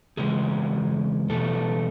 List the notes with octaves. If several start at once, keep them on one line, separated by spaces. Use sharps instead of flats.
E2 C#3 G#3 G#4
E2 B2 A3 A4